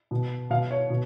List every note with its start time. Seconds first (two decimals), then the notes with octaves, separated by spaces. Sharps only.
0.11 B2
0.50 B2 F5
0.71 C#5
0.90 B2